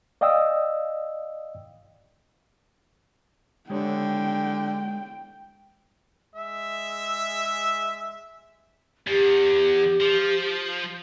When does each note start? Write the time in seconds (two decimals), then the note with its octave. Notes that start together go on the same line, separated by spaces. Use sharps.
0.21 D5 D#5 F5 G5 D#6 E6
3.70 D3 G#3 G4 C#5 G5
6.35 G#3 E5
9.07 E2 G4
10.01 F3